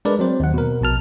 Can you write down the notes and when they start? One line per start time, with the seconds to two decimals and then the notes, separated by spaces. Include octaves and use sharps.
0.05 G#3 D4 A#4 B4 D5
0.19 F#3 C4 C5
0.40 D#2 F#5
0.54 B2 A#4
0.81 A#1 B2 A5 F6